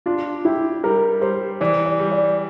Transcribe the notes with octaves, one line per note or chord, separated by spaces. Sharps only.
D4 F4
E4 G4
G3 A#4
G3 C5
E3 D5
D5
G3
D5